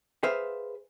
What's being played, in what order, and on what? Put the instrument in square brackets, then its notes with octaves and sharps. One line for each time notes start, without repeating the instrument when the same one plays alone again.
[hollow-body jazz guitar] G#4 B4 C5 E5 F5